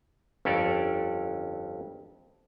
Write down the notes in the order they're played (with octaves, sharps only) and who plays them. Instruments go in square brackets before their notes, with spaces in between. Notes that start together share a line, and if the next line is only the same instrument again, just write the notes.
[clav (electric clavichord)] G1 F2 C#4 A4 A#4 D5